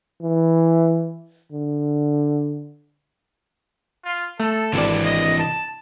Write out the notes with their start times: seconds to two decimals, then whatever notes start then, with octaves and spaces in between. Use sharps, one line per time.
0.22 E3
1.52 D3
4.04 F4
4.40 A3 A4
4.74 G#1 C3 E3 D5
5.05 D#5
5.38 A5